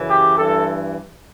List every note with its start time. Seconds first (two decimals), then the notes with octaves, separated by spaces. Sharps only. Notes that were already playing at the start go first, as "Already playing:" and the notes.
Already playing: F#2 C#3 E3
0.09 G4
0.37 G2 E3 A4